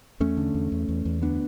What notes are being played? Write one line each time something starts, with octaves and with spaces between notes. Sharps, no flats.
E2 A3 C#4
D3
E2
E2
E2
E2
D2 B3 D4